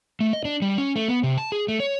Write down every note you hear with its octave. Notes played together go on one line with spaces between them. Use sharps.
A3
D#5
D4
G3
C#4
A3
B3
C3
A5
G#4
A3
C#5